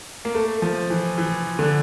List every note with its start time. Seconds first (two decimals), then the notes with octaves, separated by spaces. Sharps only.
0.25 A#3
0.35 A3
0.62 F3
0.90 E3
1.18 E3
1.59 D3